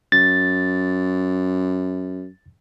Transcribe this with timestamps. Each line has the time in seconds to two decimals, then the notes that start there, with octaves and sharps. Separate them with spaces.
0.12 F#2 A6